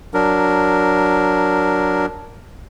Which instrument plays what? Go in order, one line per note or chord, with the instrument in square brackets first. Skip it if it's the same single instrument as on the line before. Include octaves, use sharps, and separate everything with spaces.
[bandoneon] F#3 D4 A#4